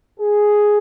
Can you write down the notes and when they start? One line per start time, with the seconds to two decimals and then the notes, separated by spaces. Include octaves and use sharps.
0.20 G#4